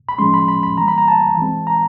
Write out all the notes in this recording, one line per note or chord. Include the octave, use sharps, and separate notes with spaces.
B5
A2 F3 G#3 C#4 C6
B5
B5
B5
E3 G3 A#3 A#5
B5
A#5
A5
E3 G#3 C4
A#5